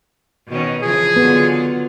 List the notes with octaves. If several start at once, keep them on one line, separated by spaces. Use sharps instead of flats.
B2 D#3 C#4
C#3 E3 F3 G#4
D3 F#3 B3 F4